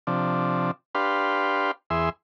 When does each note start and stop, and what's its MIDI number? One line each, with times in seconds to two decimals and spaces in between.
0.07 0.71 48
0.07 0.71 53
0.07 0.71 62
0.95 1.71 62
0.95 1.71 67
0.95 1.71 71
0.95 1.71 77
0.95 1.71 84
1.90 2.10 40
1.90 2.10 68
1.90 2.10 76
1.90 2.10 84